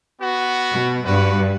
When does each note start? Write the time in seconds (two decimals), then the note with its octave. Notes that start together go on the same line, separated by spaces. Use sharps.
0.22 B3 F#4
0.71 B2
1.06 G2 F#4 B4